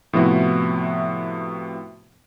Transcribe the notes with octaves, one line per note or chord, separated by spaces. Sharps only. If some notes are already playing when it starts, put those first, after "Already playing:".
A2 C3 F3 B3 E4 F#4